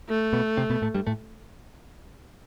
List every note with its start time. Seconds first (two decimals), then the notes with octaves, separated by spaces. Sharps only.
0.09 A3
0.33 B2 B3
0.57 C3 C4
0.70 B2 B3
0.82 A2 A3
0.94 G2 G3
1.07 A2 A3